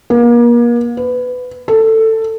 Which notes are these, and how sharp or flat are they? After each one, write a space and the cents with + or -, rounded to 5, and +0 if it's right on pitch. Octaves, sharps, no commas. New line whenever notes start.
A#3 +35
B4 +15
A4 +15